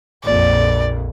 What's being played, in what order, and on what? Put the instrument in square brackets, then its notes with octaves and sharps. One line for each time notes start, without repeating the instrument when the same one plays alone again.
[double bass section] A#1 F2 [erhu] D5